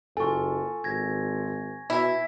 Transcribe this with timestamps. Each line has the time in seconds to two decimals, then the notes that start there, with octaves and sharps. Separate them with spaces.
0.17 F#1 F4 A4 G#5 C#6
0.84 G#1 G#6 A#6
1.90 B2 E4